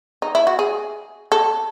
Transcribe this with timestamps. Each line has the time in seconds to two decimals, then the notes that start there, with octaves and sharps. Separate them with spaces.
0.22 D#4
0.35 E4
0.47 F#4
0.59 G#4
1.32 A4